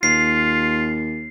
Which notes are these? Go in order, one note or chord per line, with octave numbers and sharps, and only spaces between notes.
D#2 F4 C7